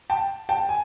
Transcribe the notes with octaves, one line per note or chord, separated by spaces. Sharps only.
G5 A5
G5 A5
G#5